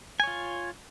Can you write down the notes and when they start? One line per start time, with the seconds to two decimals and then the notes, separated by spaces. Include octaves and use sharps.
0.20 G#5
0.23 C#5
0.27 F4